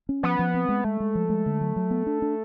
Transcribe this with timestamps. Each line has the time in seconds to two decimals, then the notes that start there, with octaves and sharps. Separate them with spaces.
0.09 C#4
0.23 F3 B3
0.39 F3
0.54 C4
0.69 G#3
0.84 G#3 A3
1.00 G#3
1.15 F3
1.30 G#3
1.46 D3
1.61 F#3
1.76 F#3
1.91 B3
2.07 D4
2.22 D4